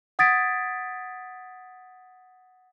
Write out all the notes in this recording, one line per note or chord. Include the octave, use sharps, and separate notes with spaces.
F#5 D#6 G#6 A6 B6 D7